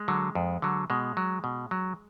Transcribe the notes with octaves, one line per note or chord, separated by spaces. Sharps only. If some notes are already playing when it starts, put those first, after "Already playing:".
Already playing: G#3
D3 F#3
F2
D3 F#3
B2 G#3
F#3
B2
F#3